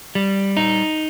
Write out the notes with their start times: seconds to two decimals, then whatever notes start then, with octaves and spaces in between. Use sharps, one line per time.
0.15 G3
0.57 D#4